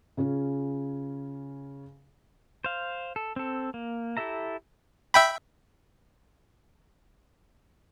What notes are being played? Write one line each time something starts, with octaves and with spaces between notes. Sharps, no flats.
C#3 C#4 F4 G#4
C5 F5
A4
C4 A4
A#3
E4 G4 A4 E5 A#5
E5 G5 B5